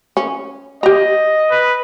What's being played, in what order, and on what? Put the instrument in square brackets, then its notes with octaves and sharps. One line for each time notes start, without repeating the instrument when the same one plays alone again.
[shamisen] C#4
[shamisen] G4 A#5 [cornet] D#5
[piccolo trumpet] B4